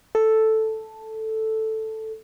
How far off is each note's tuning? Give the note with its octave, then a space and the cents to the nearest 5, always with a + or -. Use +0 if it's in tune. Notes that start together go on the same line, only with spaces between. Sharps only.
A4 +0